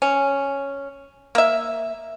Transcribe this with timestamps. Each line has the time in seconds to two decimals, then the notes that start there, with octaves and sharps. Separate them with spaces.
0.02 C#4
1.35 A#3 E5